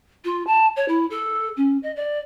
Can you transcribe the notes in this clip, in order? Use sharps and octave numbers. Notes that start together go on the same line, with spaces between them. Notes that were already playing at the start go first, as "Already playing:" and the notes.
F4
A5
C#5
E4
A4
C#4
D#5
D5